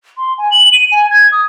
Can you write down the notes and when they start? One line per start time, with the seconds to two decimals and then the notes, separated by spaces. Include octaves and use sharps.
0.17 C6
0.38 G#5
0.51 F#7
0.73 D#7
0.92 G#5
1.11 G#6
1.32 D#6